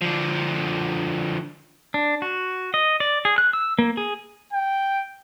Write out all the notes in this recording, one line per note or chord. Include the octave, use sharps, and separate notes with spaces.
D3 F3
D4
F#4
D#5
D5
G#4
F#6
E6
A#3
G#4
G5